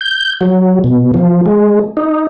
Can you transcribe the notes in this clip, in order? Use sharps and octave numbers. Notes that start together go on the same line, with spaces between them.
G6
F#3
B2
F3
G#3
D#4